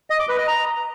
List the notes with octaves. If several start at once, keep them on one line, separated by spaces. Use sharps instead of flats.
D#5
D6
B4
D#5
A#5